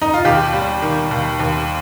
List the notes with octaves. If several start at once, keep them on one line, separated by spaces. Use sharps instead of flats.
D#4
F4
D#2 G4
G3
D#3
D#2
D#2